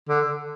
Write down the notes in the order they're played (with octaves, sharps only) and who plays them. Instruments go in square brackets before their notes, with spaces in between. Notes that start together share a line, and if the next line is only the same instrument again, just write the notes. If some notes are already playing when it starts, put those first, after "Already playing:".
[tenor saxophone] D3